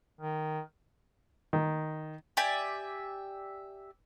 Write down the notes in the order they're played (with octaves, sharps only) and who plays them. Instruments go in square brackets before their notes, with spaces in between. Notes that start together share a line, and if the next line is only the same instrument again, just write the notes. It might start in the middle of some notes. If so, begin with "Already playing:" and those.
[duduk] D#3
[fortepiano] D#3
[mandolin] G4 D5 E5 G#5